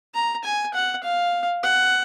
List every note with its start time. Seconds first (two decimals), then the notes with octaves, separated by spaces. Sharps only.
0.14 A#5
0.44 G#5
0.74 F#5
1.04 F5
1.63 F#5